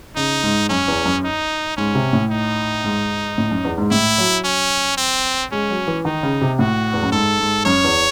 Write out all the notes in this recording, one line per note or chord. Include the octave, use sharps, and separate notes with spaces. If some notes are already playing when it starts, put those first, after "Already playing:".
C#3 D#4
G#2
F#2 C#4
E2
F#2
D#4
G#2 C#4
C3
A2
D#4
G#2
A2
F#2
E2
G#2
A2 E4
F#3
C#4
C4
G#3 C#4
F#3
E3
D#3 D#4
C#3
C3
A2 F#4
E2
F#2
G#2 A4
G#2
F#2 C#5
E2